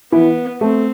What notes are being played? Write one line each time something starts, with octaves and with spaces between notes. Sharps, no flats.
E3 B3 E4
A3 C4 A4